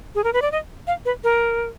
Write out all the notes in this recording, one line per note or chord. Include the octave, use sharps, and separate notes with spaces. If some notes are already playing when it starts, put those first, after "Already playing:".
G#4
A#4
B4
D5
D#5
F5
B4
A#4